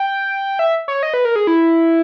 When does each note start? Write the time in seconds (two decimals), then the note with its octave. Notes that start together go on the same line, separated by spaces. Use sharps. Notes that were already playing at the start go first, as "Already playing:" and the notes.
Already playing: G5
0.59 E5
0.88 C#5
1.03 D#5
1.14 B4
1.25 A#4
1.36 G#4
1.47 E4